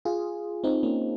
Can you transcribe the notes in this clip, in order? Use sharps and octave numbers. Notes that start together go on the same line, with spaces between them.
F4 G#4
C4 D#4
A#3 C#4